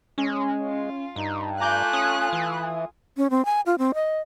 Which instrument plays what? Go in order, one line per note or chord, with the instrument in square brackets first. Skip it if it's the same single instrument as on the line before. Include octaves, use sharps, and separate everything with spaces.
[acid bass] G#3 [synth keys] C#4
[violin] F4
[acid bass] G2 [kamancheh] D#4
[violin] A3 F#6 [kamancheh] F4 G#5 [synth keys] A#5 D6 G6
[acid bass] C#4 [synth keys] D#6
[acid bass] E3
[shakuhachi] C#4
C4
G#5
F4
C4
D#5